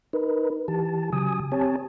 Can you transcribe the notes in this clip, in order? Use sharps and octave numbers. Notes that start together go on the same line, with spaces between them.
D#4 A#4 B4
E3 G4 A5
C#3 F#3 G#5 D#6
C4 G4 C#5 G#5 A5